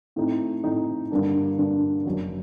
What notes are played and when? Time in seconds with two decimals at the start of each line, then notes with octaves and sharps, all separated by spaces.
0.16 A2 A3 C4 D#4
0.64 A2 A3 C4 D#4
1.11 G2 D3 G3 A#3 D4
1.58 G2 D3 G3 A#3 D4
2.06 F#1 F#2 F#3